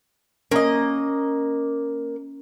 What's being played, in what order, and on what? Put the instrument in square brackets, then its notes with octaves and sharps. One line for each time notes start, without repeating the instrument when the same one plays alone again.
[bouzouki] A#3 D#5 [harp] C#4 C#5